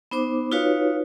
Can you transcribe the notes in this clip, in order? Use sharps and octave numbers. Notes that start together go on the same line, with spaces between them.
B3 D#4 C5 D6
D#4 F4 F#4 B4 C#5 F5